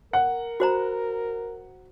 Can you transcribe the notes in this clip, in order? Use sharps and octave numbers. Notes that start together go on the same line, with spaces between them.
A#4 F#5
F#4 C5 A#5